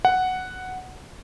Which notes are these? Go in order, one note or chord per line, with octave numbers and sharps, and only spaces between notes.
F#5